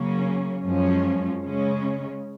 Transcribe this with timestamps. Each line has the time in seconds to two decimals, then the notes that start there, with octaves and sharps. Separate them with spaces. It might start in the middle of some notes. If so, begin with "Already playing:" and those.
Already playing: C#3 F#3 A#3 C#4
0.65 F#2 F3 G#3 C#4
1.42 C#3 G#3 C#4